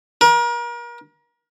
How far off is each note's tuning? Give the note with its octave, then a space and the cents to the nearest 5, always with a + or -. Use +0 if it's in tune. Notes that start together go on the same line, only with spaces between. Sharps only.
A#4 +35